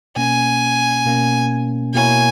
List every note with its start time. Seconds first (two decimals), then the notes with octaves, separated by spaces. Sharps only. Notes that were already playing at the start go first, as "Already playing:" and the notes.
0.16 B2 A#3 C#4 G#5
1.05 B2 A#3 C#4
1.94 B2 A#3 E4 A#4 C#5 G#5